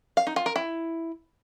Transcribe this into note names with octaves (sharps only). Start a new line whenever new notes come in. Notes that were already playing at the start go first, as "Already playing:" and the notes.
F5
D#4
F4
A#4
E4